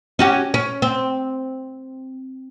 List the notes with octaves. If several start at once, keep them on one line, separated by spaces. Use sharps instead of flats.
C#4 F#4 G4
C#4
C4